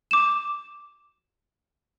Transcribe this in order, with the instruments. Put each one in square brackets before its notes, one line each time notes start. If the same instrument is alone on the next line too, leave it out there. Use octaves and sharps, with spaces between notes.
[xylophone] D6 E7